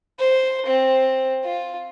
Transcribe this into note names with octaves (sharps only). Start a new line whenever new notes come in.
C5
C4
F4